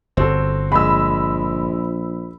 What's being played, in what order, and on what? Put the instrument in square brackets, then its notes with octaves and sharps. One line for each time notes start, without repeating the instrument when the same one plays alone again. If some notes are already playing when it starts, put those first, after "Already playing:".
[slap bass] G1 [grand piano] C4 F#4 A4
[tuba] A#1 [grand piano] G#3 [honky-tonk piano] B5 E6